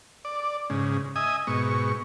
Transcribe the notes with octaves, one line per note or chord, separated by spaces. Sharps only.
D5
G#2 C#3
D#5 E5 G#5 D#6
G#2 B2 C#6